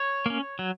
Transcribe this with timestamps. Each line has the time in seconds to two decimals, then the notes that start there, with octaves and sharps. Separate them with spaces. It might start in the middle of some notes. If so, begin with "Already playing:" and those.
Already playing: C#5
0.26 A#3 C#4
0.59 F#3